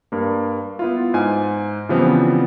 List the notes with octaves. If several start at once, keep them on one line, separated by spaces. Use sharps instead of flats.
G2 A#3
B3 E4 F4
G#2 G#5
C#3 E3 F3 G3 B3 C4